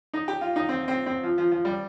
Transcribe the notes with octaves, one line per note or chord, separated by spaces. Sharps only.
D#4
G4
F4
D#4
C4
C4
C4
F3
F3
F3
G3